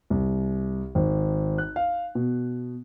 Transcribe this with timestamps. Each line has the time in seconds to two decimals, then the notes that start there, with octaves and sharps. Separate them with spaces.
0.10 C2
0.95 G#1
1.58 F#6
1.76 F5
2.15 B2